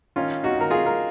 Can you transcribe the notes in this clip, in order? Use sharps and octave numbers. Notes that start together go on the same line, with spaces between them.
D#3 C#4 F4
D#4 F#4
D#3 A#4
F4 G#4
A#4